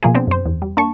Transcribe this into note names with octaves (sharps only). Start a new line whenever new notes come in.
B2 F3 A#3 F4 G#4
B3 C4 D4
F#2 C5
E2
G3
A#3 D4 A5 C#6